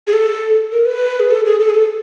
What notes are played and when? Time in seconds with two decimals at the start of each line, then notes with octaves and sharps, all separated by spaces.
0.07 G#4
0.13 A4
0.72 A#4
0.86 B4
1.20 G#4
1.30 A4
1.45 G#4
1.60 A4
1.69 G#4
1.74 A4